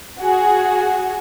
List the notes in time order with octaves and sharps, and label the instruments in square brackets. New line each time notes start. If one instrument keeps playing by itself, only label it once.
[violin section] F#4 G#4